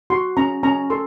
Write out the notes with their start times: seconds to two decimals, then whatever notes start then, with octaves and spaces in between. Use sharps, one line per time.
0.10 F#4 C6
0.37 C#4 A#5
0.63 C#4 A#5
0.90 A4 C6